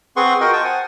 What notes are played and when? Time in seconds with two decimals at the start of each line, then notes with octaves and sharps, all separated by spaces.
0.16 C4 G#4 B4 F#5 C6 C#6
0.41 F4 F#4 A#4 D#5 F#5 G5
0.53 G5 A5 C#6 D#6
0.64 C5 F#5 G#5